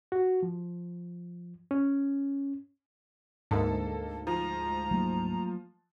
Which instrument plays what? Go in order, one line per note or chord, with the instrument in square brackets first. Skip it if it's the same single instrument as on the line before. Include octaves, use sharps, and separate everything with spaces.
[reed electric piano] F#4
F3
C#4
[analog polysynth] D2 G#2 [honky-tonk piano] A#3 A4
[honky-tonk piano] F3 [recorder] A#5
[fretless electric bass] F#3 A3 A#3